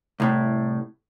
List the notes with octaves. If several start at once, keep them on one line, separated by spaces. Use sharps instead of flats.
C2 A2